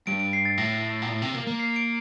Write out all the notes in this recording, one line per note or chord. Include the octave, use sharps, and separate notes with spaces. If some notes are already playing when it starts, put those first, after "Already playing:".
G2 D7
D7
C7
A6
A2 A#6
A#2
A2
C3
A#3
A#3
C7
D7